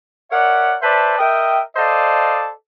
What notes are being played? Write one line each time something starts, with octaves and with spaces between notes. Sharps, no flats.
A#4 C#5 D5 E5 F#5
B4 C5 D5 E5 A5
A#4 D#5 E5 G5
A4 C5 D5 D#5 F5 A5